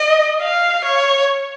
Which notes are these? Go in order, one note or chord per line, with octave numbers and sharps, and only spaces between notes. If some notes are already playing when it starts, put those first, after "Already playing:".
Already playing: D#5
F5
C#5